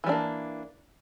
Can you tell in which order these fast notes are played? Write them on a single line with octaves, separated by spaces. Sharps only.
E3 G3 D4 A#3